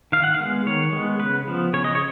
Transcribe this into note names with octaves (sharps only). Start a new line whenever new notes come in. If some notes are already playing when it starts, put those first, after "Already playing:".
D#3 F5
F#5
F5
G#3 B3
D#3 C#5
G#3 B3
C#3 B4
F3 B3
C#3 C#5
D#5
C#5